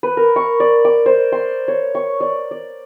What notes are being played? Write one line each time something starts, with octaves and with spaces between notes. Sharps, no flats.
B4
A#4
C#6
D5
D6
C5
C6
C#5
C#6
D5
D5